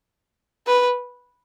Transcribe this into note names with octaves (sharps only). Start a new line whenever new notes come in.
B4